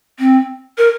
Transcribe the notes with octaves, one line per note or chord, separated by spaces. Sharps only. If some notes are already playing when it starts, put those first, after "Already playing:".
C4
A#4